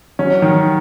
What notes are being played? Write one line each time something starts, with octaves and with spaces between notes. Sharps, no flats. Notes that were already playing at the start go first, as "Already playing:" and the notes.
F#3 C#4
D#3